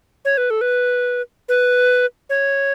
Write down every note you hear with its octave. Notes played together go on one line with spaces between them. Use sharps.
C#5
B4
A4
B4
B4
C#5